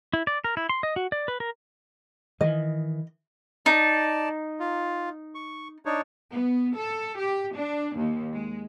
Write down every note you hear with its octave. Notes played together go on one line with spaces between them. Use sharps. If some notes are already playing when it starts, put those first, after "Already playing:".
E4
D5
A#4
E4
C6
D#5
F#4
D5
B4
A#4
D#3 E3 D#5
D#4 D5 A5
F4
C#6
D4 D#4 C#5
B3
A4
G4
D4
D#2
G#3